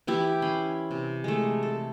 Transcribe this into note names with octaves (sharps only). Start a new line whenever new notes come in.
E3 E4 G4
C#4 B5 C6
C3
G#3 A3
A4